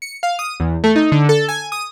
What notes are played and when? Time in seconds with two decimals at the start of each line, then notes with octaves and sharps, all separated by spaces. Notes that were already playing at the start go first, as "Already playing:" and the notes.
0.02 C#7
0.23 F5
0.39 D#6
0.60 E2
0.84 A3
0.96 D#4
1.12 D3
1.29 A4
1.49 G#5
1.72 D#6